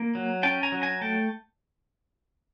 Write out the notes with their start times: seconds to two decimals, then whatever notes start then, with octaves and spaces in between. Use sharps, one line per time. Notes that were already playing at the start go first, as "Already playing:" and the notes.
Already playing: A#3
0.15 F#3
0.43 C#4 G5 A5
0.63 G#5 A#5
0.72 F#3
0.82 G#5 A#5
1.01 A3 G5 A5